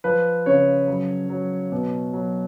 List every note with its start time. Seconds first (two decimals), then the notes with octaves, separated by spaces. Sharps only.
0.04 F3 B4
0.46 C#3 C#5
0.87 F#3
1.29 F#3
1.72 B2
2.13 F#3